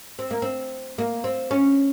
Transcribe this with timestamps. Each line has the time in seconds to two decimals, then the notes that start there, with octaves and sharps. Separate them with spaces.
0.19 C4
0.31 A#3
0.42 C4
0.98 A#3
1.24 C4
1.51 C#4